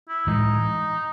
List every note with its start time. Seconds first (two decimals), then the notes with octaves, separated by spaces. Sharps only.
0.09 E4
0.27 A2 E3 G#3 D#4